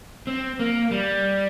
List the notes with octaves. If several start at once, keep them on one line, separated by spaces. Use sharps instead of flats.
C4
A#3
G3